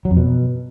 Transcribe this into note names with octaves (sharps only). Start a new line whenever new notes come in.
F#3
F2
B2